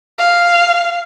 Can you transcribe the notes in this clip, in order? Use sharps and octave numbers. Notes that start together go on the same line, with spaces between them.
F5